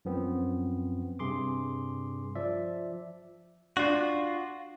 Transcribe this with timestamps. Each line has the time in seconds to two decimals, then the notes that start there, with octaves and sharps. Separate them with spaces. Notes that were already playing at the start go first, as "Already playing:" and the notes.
0.05 F#2 F3 B3 C4
1.19 G2 C3 G#4 C6 D6
2.35 F3 D5 E5
3.77 D4 F4 F#4